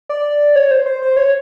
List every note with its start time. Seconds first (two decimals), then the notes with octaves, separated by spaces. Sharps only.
0.09 D5
0.56 C#5
0.71 C5
0.86 C5
1.02 C5
1.17 C#5